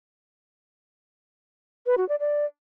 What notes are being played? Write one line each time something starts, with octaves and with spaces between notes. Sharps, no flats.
B4
F#4
D5
D5